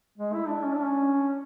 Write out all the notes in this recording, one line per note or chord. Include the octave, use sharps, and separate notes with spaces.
G#3
E4
D4
C#4
D4
C#4